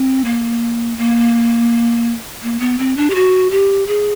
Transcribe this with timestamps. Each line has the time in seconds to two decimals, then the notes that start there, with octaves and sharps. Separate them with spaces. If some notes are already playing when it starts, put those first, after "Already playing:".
Already playing: C4
0.25 A#3
0.98 A#3
2.43 A#3
2.60 B3
2.79 C4
2.97 D4
3.10 G4
3.15 F#4
3.51 G4
3.87 G#4